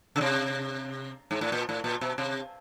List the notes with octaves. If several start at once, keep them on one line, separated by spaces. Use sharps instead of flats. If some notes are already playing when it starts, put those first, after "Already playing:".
C#3
C3
G#2
A2
A#2
A2
A#2
B2
C3